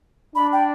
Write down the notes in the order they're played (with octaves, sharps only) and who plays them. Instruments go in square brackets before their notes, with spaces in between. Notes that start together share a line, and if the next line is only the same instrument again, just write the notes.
[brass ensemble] D4 [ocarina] B5
[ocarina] G5